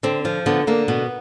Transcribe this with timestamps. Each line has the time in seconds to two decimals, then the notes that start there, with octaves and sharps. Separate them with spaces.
0.03 D3 C4
0.25 F3
0.46 D3 B3
0.67 D3 A#3
0.88 B2 B3